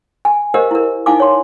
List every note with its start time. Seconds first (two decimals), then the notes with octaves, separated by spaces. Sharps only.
0.25 G#5
0.54 G4 A#4 C5 D#5 F5
0.71 E4 A#4
1.06 D#4 E4 F5 G#5 D6
1.20 C#5 C6